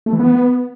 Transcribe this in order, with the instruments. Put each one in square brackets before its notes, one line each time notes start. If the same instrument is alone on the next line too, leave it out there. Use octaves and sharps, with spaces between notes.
[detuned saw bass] A3
E3
B3